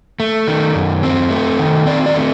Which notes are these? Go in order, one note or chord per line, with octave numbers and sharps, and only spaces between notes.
A3
D#3
F#2
C4
A3
D#3
C4 D5
D5
A3